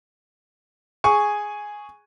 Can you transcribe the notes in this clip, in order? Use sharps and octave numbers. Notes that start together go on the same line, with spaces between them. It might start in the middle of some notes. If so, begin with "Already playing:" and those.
G#4 G#5 C#6